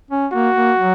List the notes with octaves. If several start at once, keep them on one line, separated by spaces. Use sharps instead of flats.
C#4
A#3 F#4
A#3
F#3